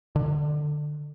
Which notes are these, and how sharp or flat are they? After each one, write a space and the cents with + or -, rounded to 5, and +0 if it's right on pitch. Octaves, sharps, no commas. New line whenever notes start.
D3 +20